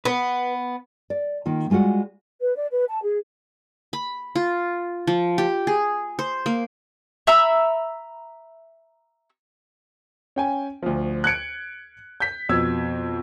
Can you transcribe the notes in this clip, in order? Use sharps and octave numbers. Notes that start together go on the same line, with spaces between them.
B3 B4
D5
D#3 A#3 F4
G3 G#3 F4 F#4 F#5
B4
D5
B4
A5
G#4
B5
F4
F3
G4
G#4
C5
A#3
E5 A#5 B5 E6
C#4 G5 G#5
D2 F3
F#6 G#6 C#7 D7
G6 B6
F2 B2 E6 G#6